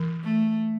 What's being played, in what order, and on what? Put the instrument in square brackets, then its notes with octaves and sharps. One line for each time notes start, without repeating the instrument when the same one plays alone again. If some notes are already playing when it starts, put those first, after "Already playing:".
Already playing: [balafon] E3
[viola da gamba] A3